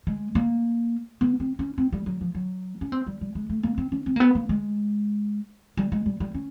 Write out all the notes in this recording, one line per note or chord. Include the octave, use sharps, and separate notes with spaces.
G#3
A#3
B3
C4
C#4
C4
G3
F#3
F3
F#3
C#4
C4
G3
G3
G#3
A3
A#3
C4
C#4
C4
A#3
B3
A#3
G#3
G3
G#3
G3
G3
C#4